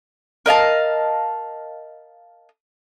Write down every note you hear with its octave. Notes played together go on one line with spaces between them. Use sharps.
A#4 D#5 F5 A5